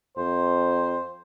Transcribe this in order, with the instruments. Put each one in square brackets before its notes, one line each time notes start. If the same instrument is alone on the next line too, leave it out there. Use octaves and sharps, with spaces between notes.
[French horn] F2 [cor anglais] C5